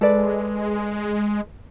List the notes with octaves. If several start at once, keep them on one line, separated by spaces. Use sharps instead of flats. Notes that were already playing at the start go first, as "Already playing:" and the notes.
G#3 A4 B4 D5